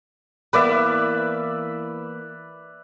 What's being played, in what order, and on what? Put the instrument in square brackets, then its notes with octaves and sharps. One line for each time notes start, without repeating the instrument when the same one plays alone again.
[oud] E3 A#3 B3 [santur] B4 D5 E5